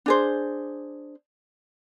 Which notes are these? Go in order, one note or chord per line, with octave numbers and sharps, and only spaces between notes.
D4 G#4 C5